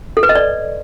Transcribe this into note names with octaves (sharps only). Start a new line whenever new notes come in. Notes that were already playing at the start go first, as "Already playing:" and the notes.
A4
B4
D#5
D5